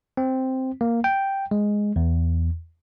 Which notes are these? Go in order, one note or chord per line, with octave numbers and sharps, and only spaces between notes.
C4
A#3
G5
G#3
E2